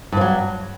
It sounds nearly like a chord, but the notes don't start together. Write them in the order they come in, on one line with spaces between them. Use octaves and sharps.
G2 F3 F#3